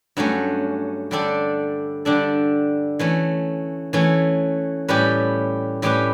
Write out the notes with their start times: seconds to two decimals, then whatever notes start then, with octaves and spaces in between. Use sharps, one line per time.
0.17 G2 F#3 A3 C#4
1.11 D3 G3 D4 A4
2.05 D3 G3 D4 A4
2.99 E3 A3 C#4
3.93 E3 A3 C#4
4.88 A2 G3 C#4 G4 B4
5.82 A2 G3 C#4 G4 B4